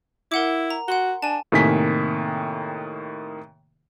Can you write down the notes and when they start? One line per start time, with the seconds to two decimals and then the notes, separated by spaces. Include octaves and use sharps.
0.32 E4 A#4 F#5 D6
0.70 A#5
0.88 F#4 F#5 C6 G7
1.22 D4 G#5 A5
1.52 A2 C3 D#3 A#3 G#5 B6